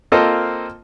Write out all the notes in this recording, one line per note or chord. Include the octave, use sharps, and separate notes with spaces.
A#3 C4 F4 A4 C5 D#5